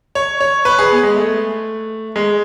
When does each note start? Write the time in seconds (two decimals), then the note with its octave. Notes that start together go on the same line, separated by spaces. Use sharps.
0.15 C#5
0.41 C#5
0.65 B4
0.79 G#4
0.91 B3
1.03 G#3
1.16 A3
2.16 G#3